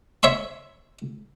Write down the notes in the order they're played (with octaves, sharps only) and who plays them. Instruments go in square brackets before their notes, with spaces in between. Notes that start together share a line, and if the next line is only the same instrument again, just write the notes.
[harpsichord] C#5 E5 B5 C6